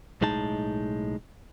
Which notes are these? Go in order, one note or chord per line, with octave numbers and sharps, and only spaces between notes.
B1 A2 G#3 D#4 A5